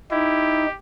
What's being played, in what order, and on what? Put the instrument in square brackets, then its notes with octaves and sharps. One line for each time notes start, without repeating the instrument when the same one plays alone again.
[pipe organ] D#4 [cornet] E4 [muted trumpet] G4